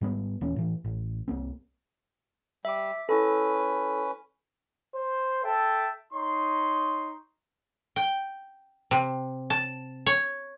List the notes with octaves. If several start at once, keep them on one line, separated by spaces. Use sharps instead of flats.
G#2 G3 G#3 B3
D#1 E3 A#3 C#4
A2 E3
A1
C2 A#3 C4
G3 E5 D6
C#4 E4 A4 B4
C5
A4 E5 G5 A5
D#4 C#5 C6
G5
C3
A5
C#5